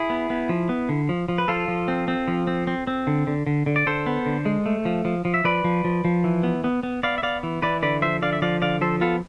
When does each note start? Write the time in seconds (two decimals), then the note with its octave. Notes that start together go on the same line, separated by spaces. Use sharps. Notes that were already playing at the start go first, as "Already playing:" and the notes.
Already playing: E4 G#4
0.10 B3
0.30 B3
0.49 F3
0.69 B3
0.89 D3
1.09 F3
1.29 F3
1.38 B4
1.48 F3 F4 A4
1.68 F3
1.88 C4
2.08 C4
2.28 F3
2.47 C4
2.67 C4
2.87 C4
3.07 D3
3.27 D3
3.46 D3
3.66 D3
3.76 D5
3.87 D3 A4 C5
4.06 B3
4.26 D3
4.46 G#3
4.66 A3
4.85 F3
5.05 F3
5.25 F3
5.34 E5
5.44 F3 B4 D5
5.64 F3
5.85 F3
6.05 F3
6.24 E3
6.43 B3
6.64 B3
6.83 B3
7.03 B3 D5 F5
7.18 E5
7.23 B3 D5 F5
7.43 E3
7.62 E3 B4 D5
7.82 D3 B4 D5
8.02 F3 C5 E5
8.22 D3 D5 F5
8.33 E5
8.42 F3 D5 F5
8.62 D3 D5 F5
8.81 F3 A4 C5
9.01 B3 F4 A4